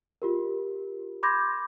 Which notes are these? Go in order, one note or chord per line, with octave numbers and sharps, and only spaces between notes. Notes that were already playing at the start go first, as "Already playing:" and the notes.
F4 G4 A#4
B5 C6 D6 G6 G#6 A#6